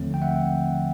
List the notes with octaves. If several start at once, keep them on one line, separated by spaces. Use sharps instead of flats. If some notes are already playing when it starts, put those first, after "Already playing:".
Already playing: D#2 D3 F3 A3 C4
G5
E5 F#5